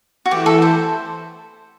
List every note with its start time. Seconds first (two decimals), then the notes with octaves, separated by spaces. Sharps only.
0.26 F#4
0.31 E3 A3 E4 G4
0.46 A4
0.62 C5